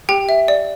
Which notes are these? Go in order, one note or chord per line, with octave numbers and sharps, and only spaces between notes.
G4 G5
E5
D5